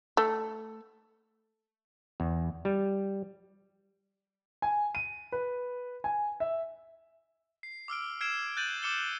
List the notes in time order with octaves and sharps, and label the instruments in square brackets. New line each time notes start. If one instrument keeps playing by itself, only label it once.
[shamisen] A3
[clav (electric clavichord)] E2
G3
[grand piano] G#5
D#7
B4
G#5
E5
[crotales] C7
D6 E6 F6 D7
E6 F6 G#6 C7 D7 E7
F#6 G6 A6 D#7 F#7
D6 F6 C#7 E7 G7